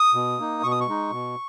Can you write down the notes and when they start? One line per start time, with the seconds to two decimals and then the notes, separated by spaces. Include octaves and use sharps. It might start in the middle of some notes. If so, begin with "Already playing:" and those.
Already playing: D#6
0.14 B2
0.38 A#3 D#4
0.63 B2 C#6
0.71 D#6
0.80 C#6
0.87 G#3 D#4
1.11 B2